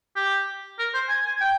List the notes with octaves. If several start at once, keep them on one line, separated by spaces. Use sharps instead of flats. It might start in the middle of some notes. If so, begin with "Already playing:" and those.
G4
A#4
C5
G#5
G#5
G5